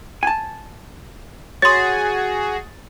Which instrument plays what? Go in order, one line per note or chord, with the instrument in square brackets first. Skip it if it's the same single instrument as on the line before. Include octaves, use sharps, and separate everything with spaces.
[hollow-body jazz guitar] G#5 A5
[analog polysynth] F#4 G#4 [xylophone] C#5 C6 [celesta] A6